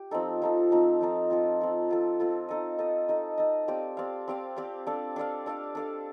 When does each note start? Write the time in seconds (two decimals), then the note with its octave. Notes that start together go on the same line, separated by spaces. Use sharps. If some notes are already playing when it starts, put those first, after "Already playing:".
Already playing: G4
0.11 F3 C4 D#4 A4
0.42 F3 C4 D#4 A4
0.71 F3 C4 D#4 A4
1.01 F3 C4 D#4 A4
1.30 C4 F4 A4
1.60 C4 F4 A4
1.89 C4 F4 A4
2.20 C4 F4 A4
2.49 D#4 A4 D#5
2.78 D#4 A4 D#5
3.09 D#4 A4 D#5
3.38 D#4 A4 D#5
3.68 C4 G4 D5 F5
3.97 C4 G4 D5 F5
4.28 C4 G4 D5 F5
4.56 C4 G4 D5 F5
4.87 D4 A4 D5 F5
5.16 D4 A4 D5 F5
5.46 D4 A4 D5 F5
5.75 D4 A4 D5 F5